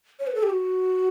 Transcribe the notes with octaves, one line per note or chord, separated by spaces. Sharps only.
C#5
B4
A4
G4
F#4